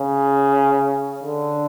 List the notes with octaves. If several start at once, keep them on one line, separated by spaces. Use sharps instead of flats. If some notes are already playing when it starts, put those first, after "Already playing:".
Already playing: C#3
D3